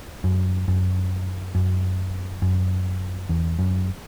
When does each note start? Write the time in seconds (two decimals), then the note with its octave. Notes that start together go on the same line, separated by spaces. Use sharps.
0.24 F#2
0.68 F#2
1.55 F#2
2.42 F#2
3.29 E2
3.59 F#2